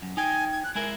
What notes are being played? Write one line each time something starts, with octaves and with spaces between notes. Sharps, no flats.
F#2
D#4 G5 G#5
G#6
F#6
G#3 E4 A#4 G#5